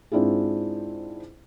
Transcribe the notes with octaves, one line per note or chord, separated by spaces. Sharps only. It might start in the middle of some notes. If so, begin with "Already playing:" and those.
G#2 C4 D4 E4 F4 G#4